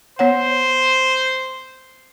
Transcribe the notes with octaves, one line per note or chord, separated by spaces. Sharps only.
B3 C5 C#5 F#5